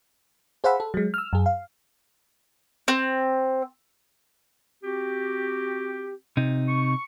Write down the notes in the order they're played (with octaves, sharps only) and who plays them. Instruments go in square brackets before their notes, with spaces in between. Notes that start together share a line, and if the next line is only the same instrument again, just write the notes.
[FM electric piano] G#4 C5 F5 F#5 B5 E6
A4
F#3 G#3
E6 F6
F#2 G#4
F5
[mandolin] C4
[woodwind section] C4 F#4 G4
[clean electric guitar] C3 D#4
[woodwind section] C#6